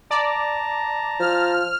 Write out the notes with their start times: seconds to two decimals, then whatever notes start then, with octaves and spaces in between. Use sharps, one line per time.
0.11 D5 A5 A#5
1.19 F3 F6